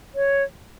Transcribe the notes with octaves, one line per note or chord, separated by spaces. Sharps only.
C#5